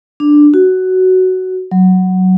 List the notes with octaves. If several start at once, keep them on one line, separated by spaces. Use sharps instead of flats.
D4
F#4
F#3